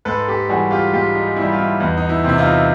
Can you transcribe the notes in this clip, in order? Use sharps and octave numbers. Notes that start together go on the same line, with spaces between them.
G#2 A4 B4
G4 A4
E3 G3 F#4 G#4
F4 G4
G#2 F4 G4
D#4
E3 G3 E4
F4
E4
E2 D#4
D#4
E4
C3 E3 E4
D#4 F4